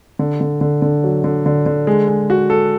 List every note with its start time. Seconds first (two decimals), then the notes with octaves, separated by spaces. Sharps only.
0.19 D3
0.41 D3
0.61 D3
0.82 D3
1.04 F#3
1.24 D3
1.46 D3
1.66 D3
1.87 G#3
2.08 G#3
2.30 F#4
2.50 A4